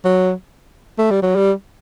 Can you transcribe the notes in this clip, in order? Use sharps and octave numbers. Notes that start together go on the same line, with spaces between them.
F#3
A3
G3
F#3
G3